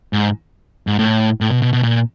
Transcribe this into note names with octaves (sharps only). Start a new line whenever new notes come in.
G#2
G#2
A2
A2
B2
B2
B2
A#2